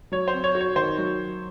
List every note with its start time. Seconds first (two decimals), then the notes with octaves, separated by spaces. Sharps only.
0.12 F#3 C#5
0.28 C5
0.33 C4
0.44 C#5
0.55 F#4
0.61 C#5
0.76 D#3 C5
0.98 F#3